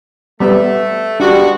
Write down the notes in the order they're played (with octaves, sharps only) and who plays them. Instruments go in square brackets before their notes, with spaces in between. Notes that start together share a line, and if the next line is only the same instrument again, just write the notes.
[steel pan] G3 B3 [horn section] A3
[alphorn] G3 [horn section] G#3 B3 F#4 [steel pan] D4